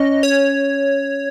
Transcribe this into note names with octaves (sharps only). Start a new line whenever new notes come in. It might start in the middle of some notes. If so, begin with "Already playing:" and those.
Already playing: C#4 D#5
C#5